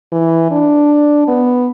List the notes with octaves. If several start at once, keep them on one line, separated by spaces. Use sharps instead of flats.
E3
D4
B3